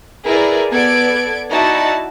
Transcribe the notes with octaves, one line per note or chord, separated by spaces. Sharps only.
E4 G#4 A#4 B4 D5
B3 A4 D5 G#6 D7
D#4 E4 F#4 D5 A5